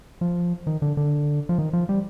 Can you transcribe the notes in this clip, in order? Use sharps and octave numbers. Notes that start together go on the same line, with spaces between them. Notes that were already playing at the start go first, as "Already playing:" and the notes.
F3
D#3
D3
D3
F3
D#3
F3
G3